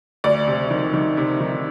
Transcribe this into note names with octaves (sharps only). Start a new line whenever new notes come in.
D2 D5
C3
D#3
D#3
C3
D#3